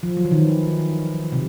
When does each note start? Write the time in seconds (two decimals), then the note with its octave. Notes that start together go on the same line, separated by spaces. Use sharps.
0.03 F3
0.17 F#3
0.25 E3
0.31 D#3
1.32 C3